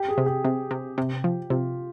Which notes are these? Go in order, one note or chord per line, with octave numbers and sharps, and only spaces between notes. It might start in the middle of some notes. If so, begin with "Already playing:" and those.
Already playing: G4
G#4
C3
G4
C3
C3
C3
F3
C3 F4